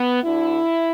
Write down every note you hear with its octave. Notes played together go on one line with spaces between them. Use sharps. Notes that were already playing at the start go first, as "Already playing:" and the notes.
Already playing: B3
D2 D3 E4